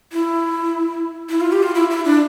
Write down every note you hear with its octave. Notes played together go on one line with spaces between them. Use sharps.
E4
E4
F4
G4
F4
E4
E4
D4